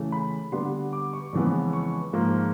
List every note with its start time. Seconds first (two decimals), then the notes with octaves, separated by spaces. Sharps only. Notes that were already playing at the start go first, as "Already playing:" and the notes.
Already playing: C#3 E3 A3
0.12 B5
0.52 D3 G3 B3 D4 C6
0.93 D6
1.13 C#6
1.33 F2 C#3 E3 G#3 B3
1.73 C#6
2.13 G#2 F3 A#3